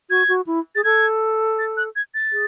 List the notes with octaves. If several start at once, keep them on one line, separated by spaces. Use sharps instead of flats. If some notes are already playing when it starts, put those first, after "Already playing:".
F#4 G#6
F#4
E4
G#4 A6
A4 G#6
A6
F#6
G#6
A6
G#4